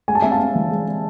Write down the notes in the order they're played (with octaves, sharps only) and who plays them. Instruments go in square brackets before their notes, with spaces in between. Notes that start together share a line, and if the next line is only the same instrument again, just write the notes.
[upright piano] G#3 G#5
A5
C4 E5 G#5
F5 A5
C4
E3
G#3
G#3